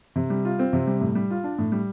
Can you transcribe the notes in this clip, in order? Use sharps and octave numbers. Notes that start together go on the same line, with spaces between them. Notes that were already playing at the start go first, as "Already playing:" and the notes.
C3
G3
F4
C4
C3
G3
A2
G3
F4
D4
A2
G3